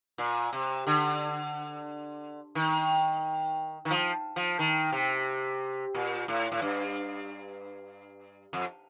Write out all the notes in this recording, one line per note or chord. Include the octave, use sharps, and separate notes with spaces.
A#2
C3
D3
D#3
D#3
F3
F3
D#3
C3
A#2
A2
A2
G2
F2